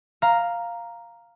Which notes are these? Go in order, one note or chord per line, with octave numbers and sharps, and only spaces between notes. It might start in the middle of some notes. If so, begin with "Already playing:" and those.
F5 A#5